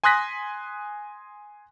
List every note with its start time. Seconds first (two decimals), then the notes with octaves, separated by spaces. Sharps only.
0.04 G#5 C6 D#6 F#6 A#6 B6